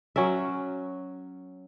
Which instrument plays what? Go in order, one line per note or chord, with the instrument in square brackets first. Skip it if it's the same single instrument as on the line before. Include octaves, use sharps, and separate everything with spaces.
[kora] F#3 C#4 A#4 E5